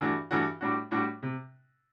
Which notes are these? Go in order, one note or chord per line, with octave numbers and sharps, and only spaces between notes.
G2 E3 A3 D4 F#4
G2 E3 A3 D4 F#4
A2 G3 D4 F#4
A2 G3 D4 F#4
C3